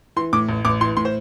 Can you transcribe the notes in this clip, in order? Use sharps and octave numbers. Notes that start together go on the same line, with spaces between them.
E3 C6
A2 D6
A1
A1 D6
E3 C6
A2 C6
C5